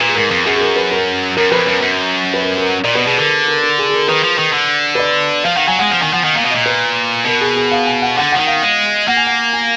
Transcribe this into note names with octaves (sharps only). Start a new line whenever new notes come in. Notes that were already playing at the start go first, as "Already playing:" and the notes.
A#2 B4
G#4
G#2 A#4
F2
F#2 G#4
G#4
A#4
B4
A#4
F#2 A#4
F2 B4
F#2 A#4
F#2
B4
A#4
A#4
A#2 D5
B2 B4
B2 G#4
D3 A#4
A#4
A#4
G#4
G#4
A#4
D#3 B4
F3
D#3
D3
B4
D5
F3 F5
D#3 F#5
F#3 G#5
G#3 F#5
F3 F#5
D#3 G#5
F3 F#5
D#3 F#5
A#2 F5
B2
A#2 D#5
B4
B2 A#4
G#4
G#4
F5
G#5
F#5
D3 F#5
F3 F#5
D#3
F5
G#3
A#3 F#5
G#5
F#5
G#5